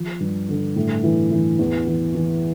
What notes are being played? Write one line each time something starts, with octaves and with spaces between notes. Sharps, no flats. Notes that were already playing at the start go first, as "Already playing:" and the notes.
Already playing: F3
G2
D3
A2
E3
E3
E2
E3
E3